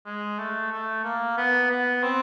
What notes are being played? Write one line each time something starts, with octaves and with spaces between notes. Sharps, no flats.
G#3
A3
A3
A#3
B3
B3
C4